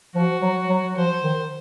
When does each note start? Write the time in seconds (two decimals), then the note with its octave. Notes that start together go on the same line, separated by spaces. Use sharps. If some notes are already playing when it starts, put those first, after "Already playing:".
0.15 F3 F#4
0.42 F#3
0.69 F#3
0.96 F3 C5
1.23 D#3